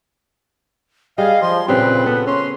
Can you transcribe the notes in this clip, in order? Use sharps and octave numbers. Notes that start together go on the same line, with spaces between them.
G3 G#4 D#5 F5
F3 C6
D2 A#2 C#3 G3 C4 B4
B3 A4
C#4 C6